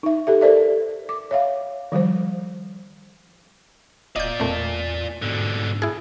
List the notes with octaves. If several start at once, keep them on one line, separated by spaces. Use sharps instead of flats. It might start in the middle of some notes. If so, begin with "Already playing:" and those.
D#4 E5
G4 A4 E5
A4 A#4 C5 D5 E5
D6
C#5 E5 F5
D#3 F3 G3 C5
D#1 F4 D5 D#5 G6
E2 A#2 A3 C4
G#2 B2 D3
E4 G#4